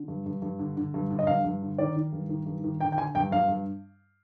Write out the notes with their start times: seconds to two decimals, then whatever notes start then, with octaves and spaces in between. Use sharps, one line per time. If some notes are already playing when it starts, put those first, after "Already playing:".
Already playing: D3
0.08 G2
0.26 G2
0.42 G2
0.59 D3
0.77 D3
0.94 G2
1.10 D3
1.19 D#5
1.27 G2 F5
1.45 G2
1.62 D3
1.78 D#3 D5
1.96 D#3
2.13 G2
2.29 D#3
2.46 G2
2.64 D#3
2.81 D3 G5
2.92 G5
2.98 D3 G#5
3.15 G2 G5
3.31 G2 F5
3.48 G2